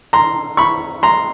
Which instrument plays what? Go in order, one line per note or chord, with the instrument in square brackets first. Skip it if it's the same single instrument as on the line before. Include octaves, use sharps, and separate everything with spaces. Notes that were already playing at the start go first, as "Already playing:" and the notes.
[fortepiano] A#5 C6
B5 C#6
A#5 C6